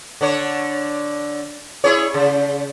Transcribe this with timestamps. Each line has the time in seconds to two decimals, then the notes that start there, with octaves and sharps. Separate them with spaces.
0.21 D3 D4 C#5
1.84 E4 G#4 C#5
2.14 C#3